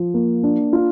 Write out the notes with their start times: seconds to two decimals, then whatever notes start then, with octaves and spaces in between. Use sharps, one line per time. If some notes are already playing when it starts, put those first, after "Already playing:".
Already playing: F3
0.14 A#3
0.43 D4
0.73 F4